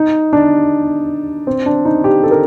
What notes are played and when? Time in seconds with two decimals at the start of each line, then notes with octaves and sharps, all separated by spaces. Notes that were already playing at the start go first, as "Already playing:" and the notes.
Already playing: D#4
0.33 D4
1.47 C4
1.66 D4
1.85 D#4
2.04 G4
2.23 A4
2.31 A#4